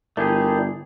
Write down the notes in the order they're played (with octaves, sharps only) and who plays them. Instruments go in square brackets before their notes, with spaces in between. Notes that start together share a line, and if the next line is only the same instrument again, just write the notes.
[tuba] G1 [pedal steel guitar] A3 G4 G#4 [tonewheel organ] E4 A#4 D5